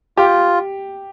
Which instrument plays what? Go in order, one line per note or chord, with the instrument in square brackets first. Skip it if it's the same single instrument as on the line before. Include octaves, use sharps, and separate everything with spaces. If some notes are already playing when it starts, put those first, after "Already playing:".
[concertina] F4 [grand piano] G4